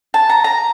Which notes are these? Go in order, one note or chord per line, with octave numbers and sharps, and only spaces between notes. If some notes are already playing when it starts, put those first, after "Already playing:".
A5
A#5
A#5